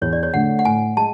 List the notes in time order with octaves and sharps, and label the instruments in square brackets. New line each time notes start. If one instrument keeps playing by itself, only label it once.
[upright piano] E2 [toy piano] C#5
[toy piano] D5
C#5
[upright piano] D3 A3 [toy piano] F#5
[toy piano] F#5
[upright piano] A2 [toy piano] G#5
[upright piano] G#3 [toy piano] A5